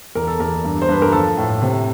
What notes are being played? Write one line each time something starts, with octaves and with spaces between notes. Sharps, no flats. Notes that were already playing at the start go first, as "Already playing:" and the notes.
E2 A#4
A4
E2 A#4
G2
C5
G2 B4
A#4
F3 A4
A2
C3